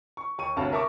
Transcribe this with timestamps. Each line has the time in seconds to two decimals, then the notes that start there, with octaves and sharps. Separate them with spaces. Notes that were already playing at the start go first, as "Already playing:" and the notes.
0.17 C#6
0.38 D#2 C#6 D#7
0.56 G1 D2 C3 C#5 F5 A5
0.72 A#4 E5 A5 C#6 D6